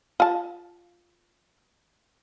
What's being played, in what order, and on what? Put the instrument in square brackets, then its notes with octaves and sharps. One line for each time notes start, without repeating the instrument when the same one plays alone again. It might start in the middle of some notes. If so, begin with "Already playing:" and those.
[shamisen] F4 A5